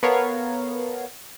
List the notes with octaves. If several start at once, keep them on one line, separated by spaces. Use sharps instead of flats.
B3 A4 A#4 C#5 F5